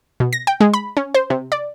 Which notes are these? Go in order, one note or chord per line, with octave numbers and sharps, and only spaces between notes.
B2
A#6
G5
G#3
B5
C#4
C5
C3
D5